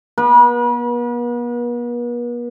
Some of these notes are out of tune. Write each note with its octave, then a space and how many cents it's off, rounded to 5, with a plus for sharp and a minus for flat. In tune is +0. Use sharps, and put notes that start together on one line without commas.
B3 -45 B4 -35